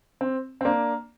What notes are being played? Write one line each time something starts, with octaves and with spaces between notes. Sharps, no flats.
C4
C4
A#3 D4